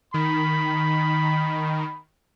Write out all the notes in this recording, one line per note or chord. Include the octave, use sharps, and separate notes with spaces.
D#3 B5